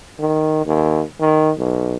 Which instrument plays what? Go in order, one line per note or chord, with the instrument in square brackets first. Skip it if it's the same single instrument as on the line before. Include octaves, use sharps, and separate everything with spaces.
[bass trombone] D#3
D#2
D#3
B1